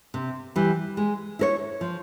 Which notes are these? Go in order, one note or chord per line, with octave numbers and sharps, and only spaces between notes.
C3
E3 G3
G#3
E4 A#4 C#5
F3